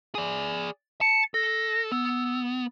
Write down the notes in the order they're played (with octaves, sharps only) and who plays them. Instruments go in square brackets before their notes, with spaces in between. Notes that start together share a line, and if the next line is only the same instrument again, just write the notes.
[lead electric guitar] G#4 D5
[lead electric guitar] A5 [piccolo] C#7
[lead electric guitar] A4 [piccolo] A#6
[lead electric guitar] B3 [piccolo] E6